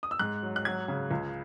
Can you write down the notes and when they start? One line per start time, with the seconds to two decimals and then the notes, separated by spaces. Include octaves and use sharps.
0.03 D#6
0.11 E6
0.19 G#2 F#6
0.42 F#3
0.56 F#6
0.65 F#3 G#6
0.88 C#3
1.11 C#2